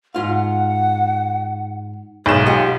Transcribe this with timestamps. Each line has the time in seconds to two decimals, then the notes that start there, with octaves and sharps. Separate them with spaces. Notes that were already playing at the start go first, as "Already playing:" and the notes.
0.15 G#2 F4 F5 F#5
2.26 B1 G#2 G#4 E7
2.46 F4 G4 D#5 F#5